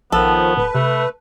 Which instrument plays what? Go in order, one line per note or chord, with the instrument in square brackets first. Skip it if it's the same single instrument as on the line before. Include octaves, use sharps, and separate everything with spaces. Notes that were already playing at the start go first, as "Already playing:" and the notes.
[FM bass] A#1 [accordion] D#3 F3 [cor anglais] B3 [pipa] A4
[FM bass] D1 [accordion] B4
[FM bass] C3 [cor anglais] A3